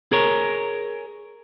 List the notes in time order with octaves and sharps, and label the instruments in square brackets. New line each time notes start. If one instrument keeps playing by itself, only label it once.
[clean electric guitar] G#4 A#4 C#5